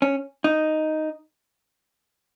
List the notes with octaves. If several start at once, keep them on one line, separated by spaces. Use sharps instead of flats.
C#4
D#4